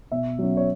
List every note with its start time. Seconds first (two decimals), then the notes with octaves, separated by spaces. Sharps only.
0.11 B2 E5
0.39 F#3 C#4
0.57 C#5